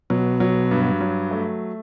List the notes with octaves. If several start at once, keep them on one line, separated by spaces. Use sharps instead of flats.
B2 F#3
F#3
G2
F#3
A3